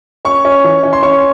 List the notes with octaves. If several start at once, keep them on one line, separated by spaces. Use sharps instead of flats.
C#4 C#6
C#4
E3
C#4
C6
C#4 C#6